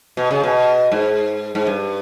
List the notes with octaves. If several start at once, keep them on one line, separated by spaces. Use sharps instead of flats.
B2
C#3
B2
G#2
G#2
G2